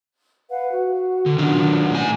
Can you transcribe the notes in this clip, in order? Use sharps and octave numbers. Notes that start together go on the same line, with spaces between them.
B4 F5 F#5
F#4
D3
D#3 F#3 C#4 D4 F4 F#5
A2 G#5